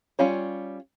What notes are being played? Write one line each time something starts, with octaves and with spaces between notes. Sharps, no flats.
G3 C#4 F4 C#5